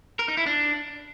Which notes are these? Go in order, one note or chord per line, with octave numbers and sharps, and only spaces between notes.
A#4
D#4
E4
D4